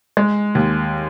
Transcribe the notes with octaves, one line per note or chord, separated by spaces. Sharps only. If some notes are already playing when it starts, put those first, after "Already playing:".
G#3
D#2